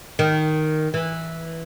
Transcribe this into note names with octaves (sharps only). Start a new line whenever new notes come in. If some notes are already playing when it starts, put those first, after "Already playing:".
D#3
E3